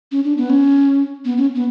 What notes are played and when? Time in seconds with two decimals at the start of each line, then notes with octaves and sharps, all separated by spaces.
0.12 C#4
0.24 D4
0.37 B3
0.50 C#4
1.25 B3
1.38 C#4
1.55 B3